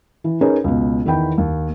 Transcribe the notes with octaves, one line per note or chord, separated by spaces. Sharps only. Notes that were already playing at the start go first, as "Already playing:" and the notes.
E3
C#4 D#4 G#4 A#4 B4 C#5
C#2 B2
E2 D#3 B3 E4 G5 B5
D#2